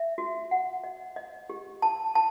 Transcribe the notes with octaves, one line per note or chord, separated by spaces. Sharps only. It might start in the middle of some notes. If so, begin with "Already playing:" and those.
Already playing: E5
F#4
F#5
D#5
D#5
G4
A5
A5